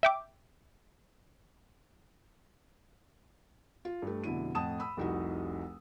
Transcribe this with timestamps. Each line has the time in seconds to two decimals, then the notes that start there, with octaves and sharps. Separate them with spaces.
0.03 E5 G5 D6
3.85 F4
4.02 G2 A3
4.24 F1 B2 D3 E4 D#7
4.55 F2 A2 F#5 A5 D#6 E7
4.80 B5 E6
4.97 F1 C2 D#4 E4 F#4